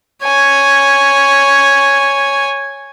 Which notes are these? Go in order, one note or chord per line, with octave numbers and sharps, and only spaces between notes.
C#5 G#5